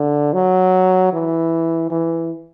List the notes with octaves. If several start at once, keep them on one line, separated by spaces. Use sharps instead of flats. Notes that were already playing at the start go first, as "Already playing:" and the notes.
Already playing: D3
F#3
E3
E3